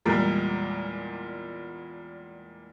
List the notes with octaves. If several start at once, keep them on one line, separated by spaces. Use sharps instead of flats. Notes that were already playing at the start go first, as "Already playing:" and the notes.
E2 A#2 G3 G#3